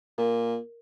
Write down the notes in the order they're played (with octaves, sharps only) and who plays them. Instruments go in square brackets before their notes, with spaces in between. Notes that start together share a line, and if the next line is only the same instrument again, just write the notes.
[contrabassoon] A#2 [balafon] A#4